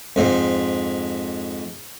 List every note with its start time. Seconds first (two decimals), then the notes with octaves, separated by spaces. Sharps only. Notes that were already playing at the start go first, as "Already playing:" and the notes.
0.16 F2 G#2